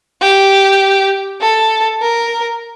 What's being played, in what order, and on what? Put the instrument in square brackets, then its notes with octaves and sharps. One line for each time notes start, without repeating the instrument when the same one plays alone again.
[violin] G4
A4
A#4